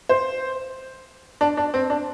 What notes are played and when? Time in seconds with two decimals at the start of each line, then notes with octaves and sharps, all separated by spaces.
0.09 C5
1.41 D4
1.57 D4
1.74 C4
1.90 D4